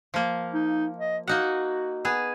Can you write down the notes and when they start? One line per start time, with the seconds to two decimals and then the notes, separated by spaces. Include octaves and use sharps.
0.14 F3 A#3
0.54 D#4
0.98 D#5
1.27 A#3 D#4 F#4 F#5
2.05 B3 G#4